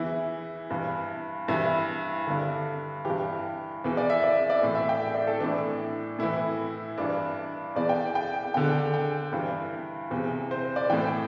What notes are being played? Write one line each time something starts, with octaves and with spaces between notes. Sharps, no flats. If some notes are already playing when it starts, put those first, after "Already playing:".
Already playing: E2 E3 E4
G2 E3
G2 E3 E4
G2 D3
G2 E3 G4
E2 E3
D5
E5
D5
E5
D5
A2 E3
E5
G5
E5
D5
A4
A2 E3 D4
A2 E3 E4
G2 E3 D4
E2 E3 D5
G5
G5
E2 D3 G5
G5
G2 E3
E2 C3 E3
C5
D5
A2 E3 G5